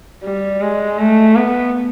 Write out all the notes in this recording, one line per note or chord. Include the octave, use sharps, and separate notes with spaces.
G3
G#3
A3
B3